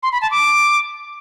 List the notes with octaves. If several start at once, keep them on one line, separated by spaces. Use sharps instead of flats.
C6
B5
A5
D6